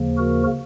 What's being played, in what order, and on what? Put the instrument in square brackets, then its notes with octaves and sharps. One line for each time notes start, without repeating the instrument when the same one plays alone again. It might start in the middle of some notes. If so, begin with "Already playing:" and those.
Already playing: [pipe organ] D#2 C#3 F3 A#3
F#4 A#4